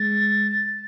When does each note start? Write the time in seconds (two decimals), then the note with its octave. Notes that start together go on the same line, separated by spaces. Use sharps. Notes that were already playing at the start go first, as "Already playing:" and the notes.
Already playing: G#3 A6
0.52 A6